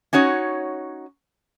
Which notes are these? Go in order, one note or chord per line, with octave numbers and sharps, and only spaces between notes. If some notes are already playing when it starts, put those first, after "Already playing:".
C#4 D#4 F#4 C#5